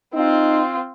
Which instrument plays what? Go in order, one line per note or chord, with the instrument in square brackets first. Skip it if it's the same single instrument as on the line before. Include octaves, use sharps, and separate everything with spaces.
[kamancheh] C4 F4 [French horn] D#4